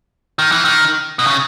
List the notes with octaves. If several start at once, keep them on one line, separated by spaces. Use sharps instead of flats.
D#3
E3
D#3
B2
C#3